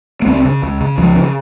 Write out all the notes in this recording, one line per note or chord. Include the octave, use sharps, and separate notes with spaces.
A#3
C#2 C4
C#3
C#2
C#3
C#2 F3
C#3